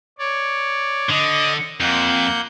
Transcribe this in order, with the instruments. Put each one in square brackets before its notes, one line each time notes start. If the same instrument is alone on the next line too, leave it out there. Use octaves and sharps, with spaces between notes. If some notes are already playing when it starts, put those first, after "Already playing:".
[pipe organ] C#5 D5
[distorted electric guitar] D3 [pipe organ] D#5 D#6
[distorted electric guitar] F2 [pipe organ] A#3 F#5 G6